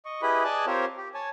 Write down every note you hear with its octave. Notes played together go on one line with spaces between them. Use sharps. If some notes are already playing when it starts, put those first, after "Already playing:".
D#5 C#6
E4 G4 G#4 B4 D#5 B5
G#4 D5 D#5 G#5 A5 F#6
C4 F4 G4 A#4 C5 C#5
G4
C#5 G#5 A5